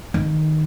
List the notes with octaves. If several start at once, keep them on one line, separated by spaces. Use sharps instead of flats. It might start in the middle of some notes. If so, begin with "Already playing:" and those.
D#3